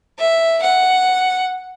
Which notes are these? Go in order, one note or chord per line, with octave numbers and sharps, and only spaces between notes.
E5
F#5